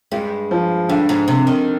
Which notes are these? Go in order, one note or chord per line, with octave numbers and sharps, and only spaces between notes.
G2 G#3
F3
G2 D3
G#2
C3
D#3